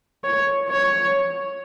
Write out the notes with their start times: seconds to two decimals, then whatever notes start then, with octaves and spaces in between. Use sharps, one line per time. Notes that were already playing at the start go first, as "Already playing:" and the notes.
0.24 C#5
0.68 C#5